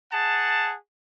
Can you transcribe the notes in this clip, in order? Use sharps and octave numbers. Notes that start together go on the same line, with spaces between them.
G#4 F#5 A5